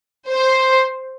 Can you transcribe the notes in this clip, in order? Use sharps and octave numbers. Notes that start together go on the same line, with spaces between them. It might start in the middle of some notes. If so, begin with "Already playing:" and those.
C5